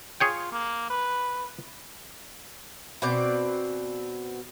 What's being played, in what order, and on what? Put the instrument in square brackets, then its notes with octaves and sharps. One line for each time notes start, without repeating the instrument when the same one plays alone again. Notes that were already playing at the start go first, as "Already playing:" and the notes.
[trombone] F4 [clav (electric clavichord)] G#4 C#5 G5
[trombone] A#3
B4
[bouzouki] B2 C4 D5